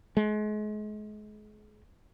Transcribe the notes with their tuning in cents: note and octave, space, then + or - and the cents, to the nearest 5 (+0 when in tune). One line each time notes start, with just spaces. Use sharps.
G#3 +35